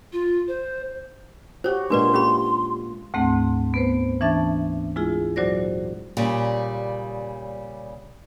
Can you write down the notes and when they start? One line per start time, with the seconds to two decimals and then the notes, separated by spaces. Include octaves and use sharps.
0.12 F4
0.48 C5
1.64 F#4 G4 C5 C#5
1.90 A#2 G#3 A#3 D4 B4 D5 C6
2.14 C#4 G4 B5
3.14 D2 G#2 A3 C4 F#5
3.74 B3 B4 C5
4.21 E3 C#4 D4 E5 A5 A6
4.96 G#3 E4 F4 G#4
5.36 A#2 F#3 F#4 C5 D5 A#6
6.17 A#2 C#3 G3